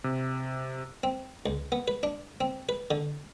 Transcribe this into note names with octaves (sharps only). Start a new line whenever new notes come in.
C3
C4
C#2
B3
B4
D4
C4
B4
D3